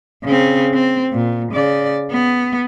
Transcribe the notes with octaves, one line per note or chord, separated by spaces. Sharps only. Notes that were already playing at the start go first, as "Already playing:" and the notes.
C#3 C4
C4
A#2
C#3 D5
B3